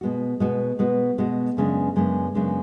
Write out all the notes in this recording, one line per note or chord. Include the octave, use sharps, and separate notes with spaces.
B2 G#3 B3 F#4
B2 G#3 B3 F#4
B2 G#3 B3 F#4
B2 G#3 B3 F#4
F#2 C#3 G#3 B3 D4
F#2 C#3 G#3 B3 D4
F#2 C#3 G#3 B3 D4